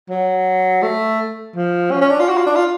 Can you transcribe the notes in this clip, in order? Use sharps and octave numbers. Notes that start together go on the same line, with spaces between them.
F#3
A3
F3
C#4
C#4
D4
F4
F#4
F4
D4
F4